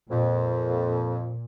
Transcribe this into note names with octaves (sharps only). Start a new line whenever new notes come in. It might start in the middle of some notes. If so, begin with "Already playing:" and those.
F2 A#2